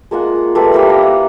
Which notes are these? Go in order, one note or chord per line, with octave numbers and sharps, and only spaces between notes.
G#3 A#3 F4 F#5
G3 A3 F4 B4
G3 A#3 B5
E4 A#5
F#5